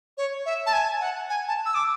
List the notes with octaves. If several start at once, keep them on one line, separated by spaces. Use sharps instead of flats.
C#5
E5
A5
G#5
F#5
G#5
A5
E6
D6